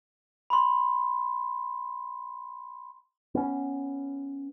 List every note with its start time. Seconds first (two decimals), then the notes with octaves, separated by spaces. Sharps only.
0.50 B5 C6
3.35 B3 C#4